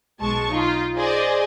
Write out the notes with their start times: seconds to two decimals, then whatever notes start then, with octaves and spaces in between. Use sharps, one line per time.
0.19 B1 G#3 A5 C#6
0.51 D#4 F4
0.97 G#4 C5 D5 D#5 G#5